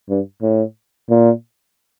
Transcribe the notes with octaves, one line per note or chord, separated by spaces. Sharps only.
G2
A2
A#2